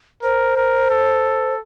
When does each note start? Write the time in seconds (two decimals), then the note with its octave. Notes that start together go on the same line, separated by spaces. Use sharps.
0.23 A#4 C5
0.57 A#4
0.90 A4